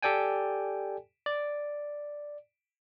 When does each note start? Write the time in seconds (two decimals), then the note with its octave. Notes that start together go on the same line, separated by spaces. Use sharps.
0.02 G4 A4 D5 G5 G#5
1.26 D5